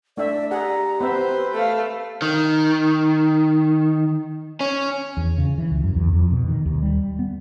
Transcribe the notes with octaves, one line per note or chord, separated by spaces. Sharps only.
A3 D4 D5 E5
G4 G#4 F#5 A#5
B3 C4 B4 C5 E5
A3 A4 F5
D#3
C#4
E2
C#3
E3
C#2
F#2
E2
F2
B2
D#3
D#2
G3
B3